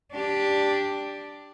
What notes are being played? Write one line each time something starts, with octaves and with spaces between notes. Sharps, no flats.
D4 G4